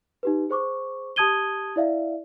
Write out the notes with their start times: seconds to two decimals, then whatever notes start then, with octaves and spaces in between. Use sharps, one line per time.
0.23 D#4 G4 B4
0.50 G#4 C5 C#6 D6
1.16 G4 A5 D#6 G#6 D#7 G7
1.76 E4 D5 E5 F5